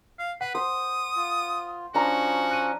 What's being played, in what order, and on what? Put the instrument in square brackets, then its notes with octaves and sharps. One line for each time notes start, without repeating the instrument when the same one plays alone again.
[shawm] F5
[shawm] B4 [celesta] F#5
[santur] C5 [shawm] D#6
[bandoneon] F4
[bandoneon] F3 C#4 [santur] D4 A#5 [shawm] F#4
[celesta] F#6 D#7